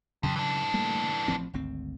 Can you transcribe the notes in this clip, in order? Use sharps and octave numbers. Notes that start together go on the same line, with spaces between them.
F2 C#3 F#3
E3 D4
G3 A3 A#3
A1 F3 C4
G#1 D2 C4